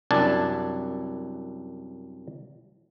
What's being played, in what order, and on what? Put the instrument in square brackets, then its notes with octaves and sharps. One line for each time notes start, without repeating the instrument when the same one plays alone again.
[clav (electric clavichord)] C2 F#2 D4 G#5 A5